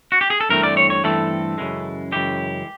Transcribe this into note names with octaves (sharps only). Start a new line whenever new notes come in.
F#4
G4
G#4
A4
G2 E3 A3 C4 A#4
D5
C#5
C#5
G2 E3 A3 C4 A4
F#2 C#3 E3 G#3
F#2 C#3 E3 G#3 G4